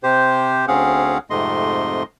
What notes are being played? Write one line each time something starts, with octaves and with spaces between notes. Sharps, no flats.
C3 G4 C5
D2 C4 C#4 G#4 F5 F#5
F2 G#2 C3 A3 D#5 C6